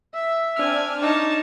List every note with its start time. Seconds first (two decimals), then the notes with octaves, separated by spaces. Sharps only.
0.14 E5 E6
0.56 C4 D4 G#5 F6
1.01 D#4 C#5 A5 D6